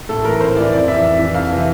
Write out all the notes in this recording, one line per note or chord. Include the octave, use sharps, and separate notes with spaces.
A2 A4
E3 A#4
A2 C5
E3 D5
F2 D5
E3 E5
F2
E3
F2 F5
C3 E3